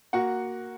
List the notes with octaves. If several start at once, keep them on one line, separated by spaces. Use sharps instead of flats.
A#3 F#4 F#5